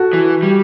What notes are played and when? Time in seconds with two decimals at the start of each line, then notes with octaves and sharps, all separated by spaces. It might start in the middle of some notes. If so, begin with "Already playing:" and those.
Already playing: F#4 A4
0.13 E3
0.43 G3